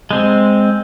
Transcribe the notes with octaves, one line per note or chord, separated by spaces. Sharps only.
G#3 C4